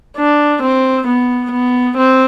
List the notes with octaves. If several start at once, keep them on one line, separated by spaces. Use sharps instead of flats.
D4
C4
B3
B3
C4